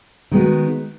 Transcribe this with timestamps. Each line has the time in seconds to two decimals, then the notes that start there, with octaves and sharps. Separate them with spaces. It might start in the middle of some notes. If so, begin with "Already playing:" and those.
0.31 D#3 G#3 B3 F#4